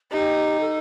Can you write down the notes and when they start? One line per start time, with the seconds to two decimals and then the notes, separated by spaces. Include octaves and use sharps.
0.12 D#4 G4
0.60 A4